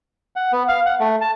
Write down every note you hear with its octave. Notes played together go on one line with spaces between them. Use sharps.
F#5
B3
F5
F#5
A3
A5